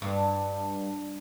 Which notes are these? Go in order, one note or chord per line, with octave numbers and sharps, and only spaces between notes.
G2